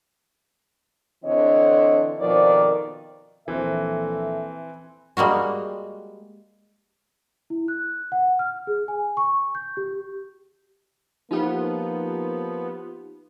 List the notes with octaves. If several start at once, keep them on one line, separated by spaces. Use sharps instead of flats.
D3 E3 C4 C#5 D#5
F2 B2 D#3 F3 A#4 D5
A#1 E3 C4 A4 E5
G3 G#3 A#3 F#4
E4
F#6
F#5
F6
G#4
G#5
C#6
G6
G4
F3 A#3 B3 D#4 F4 G4